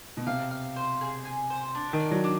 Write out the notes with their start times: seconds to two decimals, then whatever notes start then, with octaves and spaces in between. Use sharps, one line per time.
0.17 B2
0.27 C3 F5
0.51 F5
0.76 C5
1.01 G#4
1.25 G#5
1.50 C5
1.75 D4
1.93 D#3
2.00 D5
2.11 F#3
2.24 D4